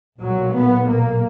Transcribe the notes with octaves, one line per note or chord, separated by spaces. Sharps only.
B1 A#2 F#3
B3
A#3